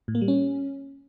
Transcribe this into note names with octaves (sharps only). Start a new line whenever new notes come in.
A2
A#3
G3
C#4